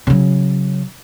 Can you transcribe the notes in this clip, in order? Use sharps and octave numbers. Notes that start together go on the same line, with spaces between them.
C#3 F#3